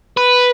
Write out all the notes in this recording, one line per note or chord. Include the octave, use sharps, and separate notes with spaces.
B4